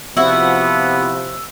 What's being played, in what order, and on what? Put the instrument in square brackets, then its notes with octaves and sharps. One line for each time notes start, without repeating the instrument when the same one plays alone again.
[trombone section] C3 F3 [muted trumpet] B3 [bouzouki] E4 F#4 [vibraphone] E6